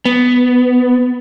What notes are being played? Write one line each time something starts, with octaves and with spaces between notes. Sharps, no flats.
B3